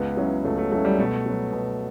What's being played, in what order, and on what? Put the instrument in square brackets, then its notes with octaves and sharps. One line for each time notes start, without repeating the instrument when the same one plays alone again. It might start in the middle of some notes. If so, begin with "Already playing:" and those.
Already playing: [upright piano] C#2 [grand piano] B3
[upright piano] C#3 F#3 C#4 E4
[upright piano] C#2 [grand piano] A3
[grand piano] A3
[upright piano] C#3 F#3 C#4 E4 [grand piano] A3
[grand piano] G3
[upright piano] B2 [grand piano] A3
[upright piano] F#3 B3
B2